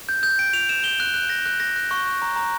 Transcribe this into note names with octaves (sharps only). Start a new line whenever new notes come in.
G6
G6
D7
F7
E7
G7
F#6
F#6
A#6
F#6
A#6
F#6
C#6
C#6
A#5
A#5